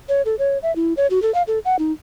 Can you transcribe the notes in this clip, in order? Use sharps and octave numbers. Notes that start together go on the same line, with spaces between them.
C#5
A4
C#5
E5
E4
C#5
F#4
A4
F5
A4
F#5
D#4